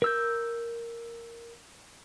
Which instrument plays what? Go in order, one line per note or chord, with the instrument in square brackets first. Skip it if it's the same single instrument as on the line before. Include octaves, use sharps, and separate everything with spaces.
[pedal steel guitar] A#4 E6 G6